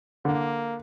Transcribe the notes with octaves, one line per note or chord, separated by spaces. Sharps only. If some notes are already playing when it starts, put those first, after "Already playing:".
D3 A#3